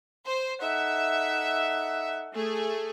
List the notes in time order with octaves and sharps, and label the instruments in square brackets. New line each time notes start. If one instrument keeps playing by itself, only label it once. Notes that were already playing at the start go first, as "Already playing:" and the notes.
[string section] C5
[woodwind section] D#4 A4 F#5 [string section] E5
[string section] A3 G#4